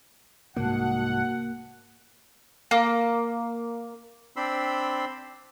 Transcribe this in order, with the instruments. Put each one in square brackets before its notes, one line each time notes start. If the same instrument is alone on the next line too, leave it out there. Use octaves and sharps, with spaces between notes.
[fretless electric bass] C2 G#2 [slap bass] A#3 [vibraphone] F#4 A5 [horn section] F#5
[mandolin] A#3
[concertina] C4 D4 B5 C6 E6